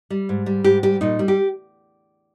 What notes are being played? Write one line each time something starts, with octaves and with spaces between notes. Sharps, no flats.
G3
G#2
G3
G#2 G4
G3 G4
A#2 D#4
G3
G4